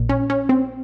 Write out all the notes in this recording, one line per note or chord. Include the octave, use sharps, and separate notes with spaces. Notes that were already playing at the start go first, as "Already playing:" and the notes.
Already playing: A#1 A#2
C#4
C#4
C4